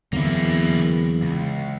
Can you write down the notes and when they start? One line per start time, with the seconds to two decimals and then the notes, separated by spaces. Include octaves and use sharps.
0.13 E2 D3 F#3 A#3 C4 E4
1.22 C#2